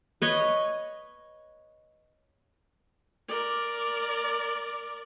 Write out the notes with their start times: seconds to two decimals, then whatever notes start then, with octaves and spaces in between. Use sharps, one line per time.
0.22 B4 C#5 D#5
3.28 A#4 D5